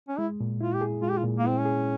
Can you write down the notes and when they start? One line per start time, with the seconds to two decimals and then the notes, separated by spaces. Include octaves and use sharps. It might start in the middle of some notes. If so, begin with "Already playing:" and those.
0.09 C#4
0.18 G#3 E4
0.40 A#2
0.61 E4 F4
0.75 G4
0.81 G#4
1.02 G#3 F4
1.10 G4
1.18 F4
1.24 A#2
1.38 A#3
1.44 C4 E4
1.58 C#4
1.65 G#4